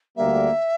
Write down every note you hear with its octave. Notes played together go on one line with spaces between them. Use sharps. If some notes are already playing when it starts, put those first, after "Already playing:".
D2 D3 G3 A#3 E5